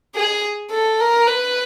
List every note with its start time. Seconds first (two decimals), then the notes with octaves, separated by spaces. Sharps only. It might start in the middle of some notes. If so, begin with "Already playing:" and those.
0.15 G#4
0.71 A4
1.00 A#4
1.28 B4